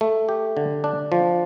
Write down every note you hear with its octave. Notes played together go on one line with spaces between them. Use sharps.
A3
G4
D3
D4
F3